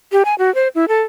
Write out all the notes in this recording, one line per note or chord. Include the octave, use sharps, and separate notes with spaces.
G4
G#5
F#4
C5
E4
A4